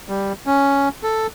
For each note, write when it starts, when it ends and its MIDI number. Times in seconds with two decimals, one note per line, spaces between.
0.09 0.33 55
0.46 0.89 61
1.03 1.27 69